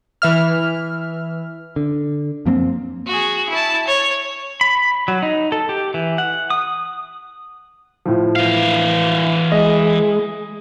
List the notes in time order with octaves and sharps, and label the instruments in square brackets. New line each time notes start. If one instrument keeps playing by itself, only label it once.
[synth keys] E3 E5 F6
[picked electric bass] D3
F#2 F3 A#3 C4
[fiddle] F#4 G#4
E4 A5
C#5
[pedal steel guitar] B5
F#3
D#4
A4
G4
E3
F#5
D#6
[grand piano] A2 F3
[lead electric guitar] E3 F5
[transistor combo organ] G#3 [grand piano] D#5